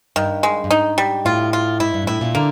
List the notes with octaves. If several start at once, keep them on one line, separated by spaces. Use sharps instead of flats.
G2 D#3
G#3
G2
G#2 D#4
G3
A2 F4
F4
G#2 E4
G2
A#2
A2 E4
A#2
D3 A#3